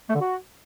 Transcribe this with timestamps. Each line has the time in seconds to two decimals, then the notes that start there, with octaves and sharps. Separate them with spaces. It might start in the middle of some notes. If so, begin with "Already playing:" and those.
0.08 A3
0.14 D3
0.20 F#4